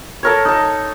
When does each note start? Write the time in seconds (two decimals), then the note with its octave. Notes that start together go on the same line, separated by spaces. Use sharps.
0.23 A4 A#4 C#5
0.45 D#4 A4